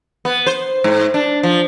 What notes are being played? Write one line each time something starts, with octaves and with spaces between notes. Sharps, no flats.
B3
C5
G#2
D4
F3